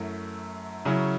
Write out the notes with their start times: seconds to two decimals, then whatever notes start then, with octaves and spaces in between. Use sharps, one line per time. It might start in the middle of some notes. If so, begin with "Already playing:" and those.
Already playing: F#2 F#3 A3 E4
0.85 C#3 F#3 C#4 E4